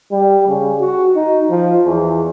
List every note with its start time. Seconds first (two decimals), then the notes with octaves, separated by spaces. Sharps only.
0.11 G3
0.48 C#3
0.80 F#4
1.16 D#4
1.50 F3
1.85 E2